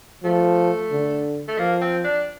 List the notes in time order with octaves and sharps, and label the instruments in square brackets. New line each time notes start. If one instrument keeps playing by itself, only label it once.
[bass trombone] F3 [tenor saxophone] A3
[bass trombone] D3
[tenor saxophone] A3
[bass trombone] F3 [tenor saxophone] A#3
[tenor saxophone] C4
D4